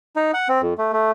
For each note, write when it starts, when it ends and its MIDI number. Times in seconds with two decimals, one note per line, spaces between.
0.16 0.31 63
0.34 0.48 78
0.49 0.61 60
0.61 0.74 41
0.78 0.93 57
0.93 1.11 57